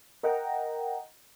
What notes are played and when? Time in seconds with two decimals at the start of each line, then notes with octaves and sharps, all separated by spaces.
0.23 A#4 D#5 F#5 G5 A#5